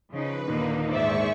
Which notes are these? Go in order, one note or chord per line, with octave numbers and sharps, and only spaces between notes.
C#3 F3 D#4 B4
D#2 A#2 D3 D#3 A#3 D#4
G#2 G#4 C5 D5 E5 C#6